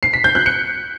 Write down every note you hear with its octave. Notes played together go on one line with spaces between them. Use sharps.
C7
B6
G6
F#6
C#7